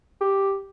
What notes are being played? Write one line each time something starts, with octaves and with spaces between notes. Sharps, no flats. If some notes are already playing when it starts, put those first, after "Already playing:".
G4